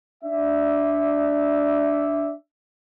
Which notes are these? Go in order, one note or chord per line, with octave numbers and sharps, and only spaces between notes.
D4 D5 E5